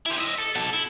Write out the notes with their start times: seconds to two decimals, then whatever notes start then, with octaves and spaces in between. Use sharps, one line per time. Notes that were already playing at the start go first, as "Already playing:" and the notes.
0.06 E4 C5
0.18 D#5 E5
0.38 A4
0.55 B2 A4
0.73 E4